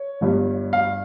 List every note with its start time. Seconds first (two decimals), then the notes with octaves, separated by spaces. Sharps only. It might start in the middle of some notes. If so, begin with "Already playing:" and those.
Already playing: C#5
0.21 G1 G2 G3
0.73 F5